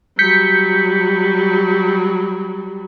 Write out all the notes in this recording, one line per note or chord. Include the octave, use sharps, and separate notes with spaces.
F#3 G3 G6 B6 C#7